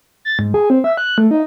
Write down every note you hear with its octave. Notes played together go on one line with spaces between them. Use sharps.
A6
G#2
G#4
C4
E5
F#6
A3
D#4